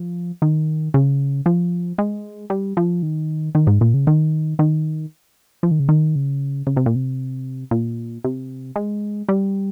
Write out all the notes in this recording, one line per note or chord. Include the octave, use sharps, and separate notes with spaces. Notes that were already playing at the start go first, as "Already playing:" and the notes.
Already playing: F3
D#3
C#3
F3
G#3
G3
F3
D#3
D#3
G#2
A#2
C#3
D#3
D#3
F3
D#3
C#3
D#3
C#3
C#3
C3
A#2
C3
A#2
C3
G#3
G3